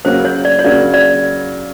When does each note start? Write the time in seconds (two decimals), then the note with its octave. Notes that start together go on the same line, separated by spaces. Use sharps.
0.05 C#3 F#3 A#3 C5
0.25 C#5
0.45 D5
0.59 C#5
0.64 C#3 F#3 A#3 D5
0.94 D5